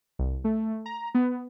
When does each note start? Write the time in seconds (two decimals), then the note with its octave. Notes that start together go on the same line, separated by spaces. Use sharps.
0.19 C2
0.44 A3
0.86 A#5
1.15 B3